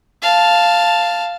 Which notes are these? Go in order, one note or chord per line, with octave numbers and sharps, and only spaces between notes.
F5 A5